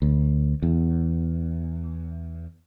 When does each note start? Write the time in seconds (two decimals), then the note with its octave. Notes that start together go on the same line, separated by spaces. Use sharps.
0.02 D2
0.62 E2